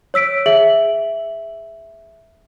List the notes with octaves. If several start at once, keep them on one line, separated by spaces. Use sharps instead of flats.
C#5 E6 B6 D7
G#4 E5 F#7